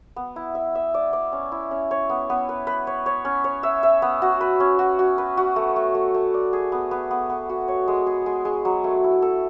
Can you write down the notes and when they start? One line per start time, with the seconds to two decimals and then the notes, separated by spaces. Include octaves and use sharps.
0.16 B3
0.36 E4
0.55 E5
0.75 E5
0.94 D5
1.13 D5
1.33 C#4
1.52 E4
1.71 C#4
1.91 C#5
2.10 B3
2.30 B3
2.49 B4
2.67 B4
2.87 C#5
3.06 C#5
3.25 C#4
3.44 C#5
3.63 E5
3.83 E5
4.02 B3
4.22 F#4
4.41 B4
4.60 C#4
4.79 F#4
4.99 F#4
5.18 B4
5.37 F#4
5.56 A3
5.76 A3
5.95 A3
6.14 A3
6.34 D5
6.53 G#4
6.72 B3
6.91 B3
7.11 B3
7.30 B3
7.49 F#4
7.68 C#5
7.88 G#3
8.07 G#4
8.26 G#3
8.45 G#3
8.65 F#3
8.84 A3
9.04 E4
9.22 A4